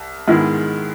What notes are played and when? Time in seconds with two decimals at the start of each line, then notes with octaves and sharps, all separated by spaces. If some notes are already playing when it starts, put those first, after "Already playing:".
Already playing: C2
0.28 G#2 D#3 G#3 B3 E4